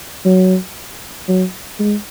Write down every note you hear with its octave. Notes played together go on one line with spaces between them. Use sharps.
F#3
F#3
G#3